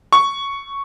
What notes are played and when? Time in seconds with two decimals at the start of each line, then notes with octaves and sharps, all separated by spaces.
0.13 C#6